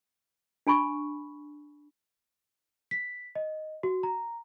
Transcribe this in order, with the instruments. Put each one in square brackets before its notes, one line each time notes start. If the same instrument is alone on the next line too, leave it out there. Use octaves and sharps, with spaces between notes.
[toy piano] D4 G#5 B5 C#6
[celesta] B6
D#5
F#4
A#5